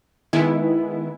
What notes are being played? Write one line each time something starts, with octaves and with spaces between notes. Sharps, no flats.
D#3 G#3 B3 E4